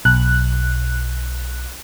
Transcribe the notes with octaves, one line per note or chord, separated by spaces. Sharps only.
B1 F#6